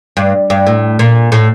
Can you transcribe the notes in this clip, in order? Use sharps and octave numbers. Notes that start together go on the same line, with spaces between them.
G2
G2
A2
A#2
A2